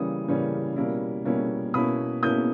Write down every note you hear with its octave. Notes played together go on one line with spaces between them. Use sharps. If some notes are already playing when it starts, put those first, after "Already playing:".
Already playing: C#3 E3 G3 A#3 C#4 D#6
C#3 E3 G3 A#3 C#4
B2 G3 A#3 C#4 E4
B2 G3 A#3 C#4 E4
B2 A#3 C#4 E4 B5 D#6
B2 A#3 C#4 E4 D#6 G6